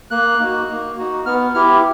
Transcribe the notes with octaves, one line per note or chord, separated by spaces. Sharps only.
A#3 F#6
D#4 F#4
A#3
D#4 F#4
B3 F6
E4 G4 F6